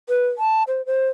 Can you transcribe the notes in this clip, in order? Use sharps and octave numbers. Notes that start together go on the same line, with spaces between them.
B4
A5
C5
C5